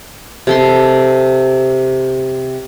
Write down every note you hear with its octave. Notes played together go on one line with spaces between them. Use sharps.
C3 A4 C6